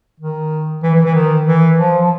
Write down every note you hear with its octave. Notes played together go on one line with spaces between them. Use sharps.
D#3
E3
E3
E3
D#3
E3
F3
F3